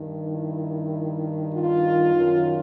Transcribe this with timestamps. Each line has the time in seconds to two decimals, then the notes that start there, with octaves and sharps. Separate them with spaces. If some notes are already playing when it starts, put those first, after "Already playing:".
Already playing: G2 D#3
0.30 E4
1.53 F4
2.13 F#2 D#3